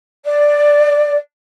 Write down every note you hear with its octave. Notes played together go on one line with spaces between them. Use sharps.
D5